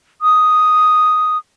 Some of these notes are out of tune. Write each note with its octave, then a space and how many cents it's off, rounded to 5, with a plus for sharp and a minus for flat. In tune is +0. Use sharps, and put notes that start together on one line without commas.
D#6 +0